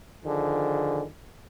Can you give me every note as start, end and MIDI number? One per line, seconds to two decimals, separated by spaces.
0.24 1.04 50
0.24 1.04 51
0.24 1.04 53
0.24 1.04 68